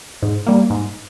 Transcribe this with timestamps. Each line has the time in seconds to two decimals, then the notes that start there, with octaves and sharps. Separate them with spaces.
0.23 G#2
0.47 G3 A#3
0.70 G#2